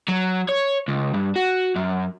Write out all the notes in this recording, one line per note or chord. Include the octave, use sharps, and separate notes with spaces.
F#3
C#5
C#2
G2
F#4
F#2